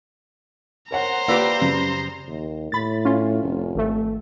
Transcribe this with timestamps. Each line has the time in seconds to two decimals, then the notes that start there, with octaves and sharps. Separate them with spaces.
0.91 A#4 C5 C#5 F#5 A#5
1.28 A#3 F4 G4 B4 D5 E6
1.61 F#2 C#3
2.27 D#2
2.72 A2 B5 A6
3.05 C#4 F4
3.43 F1
3.75 G#1 A3